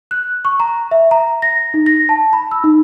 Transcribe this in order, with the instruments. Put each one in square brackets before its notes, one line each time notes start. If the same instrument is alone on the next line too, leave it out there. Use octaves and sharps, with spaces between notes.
[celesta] F#6
C#6
A#5
E5
A#5
A#6
D#4
A#6
A5
B5
E6
D#4